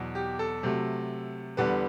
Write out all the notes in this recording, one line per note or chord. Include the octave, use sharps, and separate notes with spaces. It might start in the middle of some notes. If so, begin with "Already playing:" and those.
Already playing: E2 B2 F#3
G4
A4
C3 F#3 A3
E2 D3 G3 B3 B4